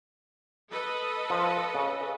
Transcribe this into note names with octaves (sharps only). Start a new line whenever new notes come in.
A4 B4 D#5
F3
C#3